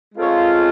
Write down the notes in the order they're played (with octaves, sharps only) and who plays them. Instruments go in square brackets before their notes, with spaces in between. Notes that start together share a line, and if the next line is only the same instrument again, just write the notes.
[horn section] G#3 C4 F4 A4 C#5